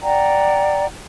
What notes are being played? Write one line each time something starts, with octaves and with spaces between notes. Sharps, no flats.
D5 F#5 G5 A#5